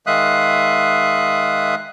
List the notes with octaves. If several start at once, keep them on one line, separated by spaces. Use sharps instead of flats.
D#3 G#3 E5 F5 D#6 F#6